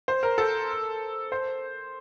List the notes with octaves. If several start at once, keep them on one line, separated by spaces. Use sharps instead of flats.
C5
A#4
A4
C5